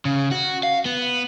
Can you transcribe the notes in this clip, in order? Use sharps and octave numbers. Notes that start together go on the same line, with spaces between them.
C#3
F#4
F5
B3